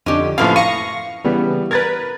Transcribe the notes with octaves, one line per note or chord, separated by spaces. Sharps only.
F2 D3 C#4 D#4 G4
F#2 A2 F3 A#3 B3 F5
F5 C#6 A#6 D#7
C#3 E3 G3 B3
A#4 B4 G#6 A6